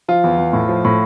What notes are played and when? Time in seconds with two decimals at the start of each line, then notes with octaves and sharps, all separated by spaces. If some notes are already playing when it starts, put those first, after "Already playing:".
0.08 F3 F4
0.24 E2
0.38 E2
0.53 A2
0.69 F3
0.84 A2